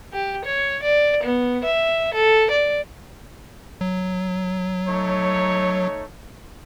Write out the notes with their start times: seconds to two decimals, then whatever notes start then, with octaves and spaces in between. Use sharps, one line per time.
0.13 G4
0.45 C#5
0.83 D5
1.23 B3
1.64 E5
2.14 A4
2.51 D5
3.81 F#3
4.88 A3 D#4 C#5